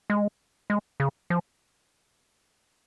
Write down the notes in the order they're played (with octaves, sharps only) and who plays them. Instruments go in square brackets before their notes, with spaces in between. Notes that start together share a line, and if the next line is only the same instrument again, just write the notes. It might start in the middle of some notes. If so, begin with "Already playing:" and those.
[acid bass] G#3
G#3
C#3
F3